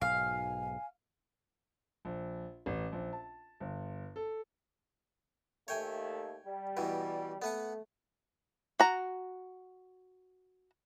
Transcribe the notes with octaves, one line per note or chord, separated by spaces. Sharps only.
B1 G#2 B2 F5 G#5
A#1
A1
A#1
A5
G1
A4
D#2 A3 C#5 G5 G#5
G3
G2 B2 E3
A3 B3 B4 F#5
F#4 A#5